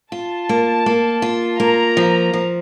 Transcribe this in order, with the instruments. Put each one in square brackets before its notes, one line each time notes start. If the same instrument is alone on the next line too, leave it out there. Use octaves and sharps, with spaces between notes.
[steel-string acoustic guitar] F4 [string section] A5
[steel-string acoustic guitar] A#3
A#3
F4
[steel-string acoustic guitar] A#3 [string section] A#5
[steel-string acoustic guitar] F3
F3